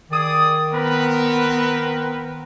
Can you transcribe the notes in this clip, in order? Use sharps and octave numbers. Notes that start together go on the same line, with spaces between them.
D#3 G#4 D5 D#6
B3 C4 A#4 B4